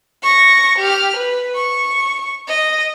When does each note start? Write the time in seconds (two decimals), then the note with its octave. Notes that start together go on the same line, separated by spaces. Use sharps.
0.23 C#6 A#6
0.78 G4 F6
1.16 B4
1.55 C#6
2.47 D#5